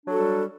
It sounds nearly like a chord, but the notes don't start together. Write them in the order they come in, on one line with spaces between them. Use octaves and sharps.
D4 F#3 A4 F#4 G3